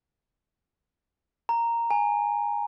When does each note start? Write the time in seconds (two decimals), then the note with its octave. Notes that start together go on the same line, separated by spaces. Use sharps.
1.49 A#5
1.91 G#5